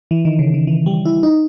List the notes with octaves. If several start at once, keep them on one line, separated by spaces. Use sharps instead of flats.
E3
D#3
C#3
D#3
E3
G3
E4
D#4